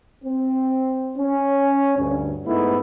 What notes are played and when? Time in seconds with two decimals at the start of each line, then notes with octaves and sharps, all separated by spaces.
0.25 C4
1.17 C#4
1.98 D2 G2
2.46 G#2 A3 B3 D#4 E4